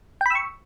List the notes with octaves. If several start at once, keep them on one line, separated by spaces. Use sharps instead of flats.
G5 B5 C#6 E6